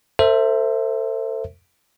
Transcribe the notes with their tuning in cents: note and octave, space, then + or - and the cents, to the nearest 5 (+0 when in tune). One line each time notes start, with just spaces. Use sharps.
A4 +40 C5 +0 E5 +0